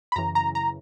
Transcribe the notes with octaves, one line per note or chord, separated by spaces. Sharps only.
B5
F#2 C#3 E3 A#5
A#5
A#5